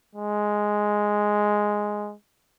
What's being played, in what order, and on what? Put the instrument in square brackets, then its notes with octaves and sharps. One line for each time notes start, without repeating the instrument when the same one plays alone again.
[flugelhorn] G#3